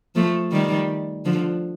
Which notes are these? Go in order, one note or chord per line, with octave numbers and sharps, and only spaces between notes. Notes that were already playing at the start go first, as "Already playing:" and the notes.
F3 A3
D#3 G3
D3 F3